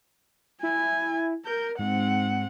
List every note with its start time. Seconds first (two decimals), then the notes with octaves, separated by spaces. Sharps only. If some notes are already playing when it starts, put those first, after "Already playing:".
0.63 E4 G#5
1.45 A#4 G6
1.79 G#2 C4 F#5